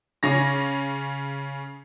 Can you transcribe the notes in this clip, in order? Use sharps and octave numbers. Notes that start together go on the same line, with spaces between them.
C#3 C#4 A#6